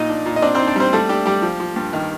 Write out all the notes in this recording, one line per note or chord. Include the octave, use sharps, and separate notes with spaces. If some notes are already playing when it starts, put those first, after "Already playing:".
Already playing: A#2 D#4 D#5
D4
A#2
D#5
C4 D4 D5
C4 C5
D#4
D4 D5
G3 C4 C5
G3 A3 A4
D4 G4
G3 G4
F3
F3
G2
D#3